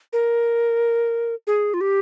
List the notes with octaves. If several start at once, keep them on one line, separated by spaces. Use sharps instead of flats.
A#4
G#4
F4
G4